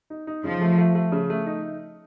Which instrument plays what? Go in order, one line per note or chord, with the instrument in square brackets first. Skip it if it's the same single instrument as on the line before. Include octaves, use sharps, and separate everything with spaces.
[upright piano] D#4
D#4
[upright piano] C#3 [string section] F3
[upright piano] A3
A3
A3
C#3
A3
D#4